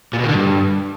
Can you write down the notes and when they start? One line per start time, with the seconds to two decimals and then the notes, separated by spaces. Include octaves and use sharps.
0.13 A#2
0.18 B2
0.24 D#3
0.29 D3
0.34 G2